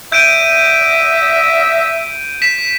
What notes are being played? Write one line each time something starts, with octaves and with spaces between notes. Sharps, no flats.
E5 G6 D7 D#7
B6 E7